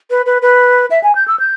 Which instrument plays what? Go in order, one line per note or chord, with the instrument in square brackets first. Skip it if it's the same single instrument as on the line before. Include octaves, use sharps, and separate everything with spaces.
[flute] B4
B4
B4
E5
G#5
G6
E6
G6